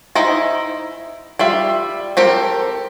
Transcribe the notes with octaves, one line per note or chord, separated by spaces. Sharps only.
D#4 E4 C5 A#5
G3 F4 E5
C4 G4 A4 A#4